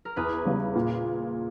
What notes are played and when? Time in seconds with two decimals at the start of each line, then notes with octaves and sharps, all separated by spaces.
0.05 A#4
0.16 E2 G#4 B4
0.45 C#3 G3 B3
0.75 A#2